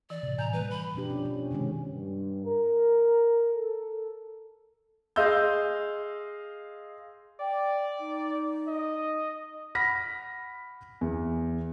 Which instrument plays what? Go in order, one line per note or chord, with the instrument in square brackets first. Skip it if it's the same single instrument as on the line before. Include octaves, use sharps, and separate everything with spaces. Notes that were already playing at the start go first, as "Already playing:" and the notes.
[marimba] E3 [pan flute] D5
[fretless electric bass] A2 C3
[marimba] G#5 G6 [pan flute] A#5
[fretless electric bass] E3 G3 A#3 [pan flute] B4
[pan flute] B5
[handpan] B2 F3 D4 G4
C#4
C#4
C3 D#3 G#3 C#4
[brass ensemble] G2
A#4
A4
[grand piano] G#4 D#5 F5 C6 E6 G6
[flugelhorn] D5 [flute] G5
[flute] D#4
[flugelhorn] D#5
[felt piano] F#5 B5 F6 A#6 B6
E2